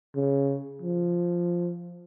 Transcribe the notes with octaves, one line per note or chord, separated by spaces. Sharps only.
C#3
F3